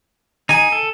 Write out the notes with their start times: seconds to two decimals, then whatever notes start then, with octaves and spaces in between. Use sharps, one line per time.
0.49 D#4 G#4 G#5
0.72 A4